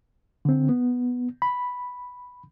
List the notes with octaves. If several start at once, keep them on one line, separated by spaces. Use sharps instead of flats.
D3 C4
B3
B5